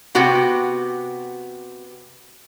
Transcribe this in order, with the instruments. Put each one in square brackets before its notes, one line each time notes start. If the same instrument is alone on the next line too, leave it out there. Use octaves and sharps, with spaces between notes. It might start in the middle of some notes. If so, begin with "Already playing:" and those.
[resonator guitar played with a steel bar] C3 B3 F#4 G5